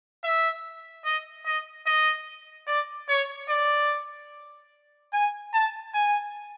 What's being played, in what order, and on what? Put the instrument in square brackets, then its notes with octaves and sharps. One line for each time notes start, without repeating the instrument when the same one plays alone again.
[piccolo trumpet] E5
D#5
D#5
D#5
D5
C#5
D5
G#5
A5
G#5